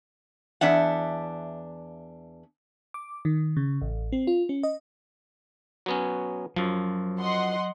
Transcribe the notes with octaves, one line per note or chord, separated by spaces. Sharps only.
E2 D4 E5 F#5
D6
D#3
C#3
A1
C4
F4
C#4
D#5
F#3 B3 C#4
F#2 F3 F#3
D#5 F#5 C6